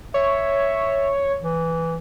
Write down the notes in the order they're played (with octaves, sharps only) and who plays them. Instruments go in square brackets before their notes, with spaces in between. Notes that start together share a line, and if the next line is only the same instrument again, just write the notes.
[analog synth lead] C#5 [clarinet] E5
[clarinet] E3